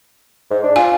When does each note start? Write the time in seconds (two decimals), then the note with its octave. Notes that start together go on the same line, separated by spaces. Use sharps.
0.50 G#2
0.63 D4
0.76 F4 G#5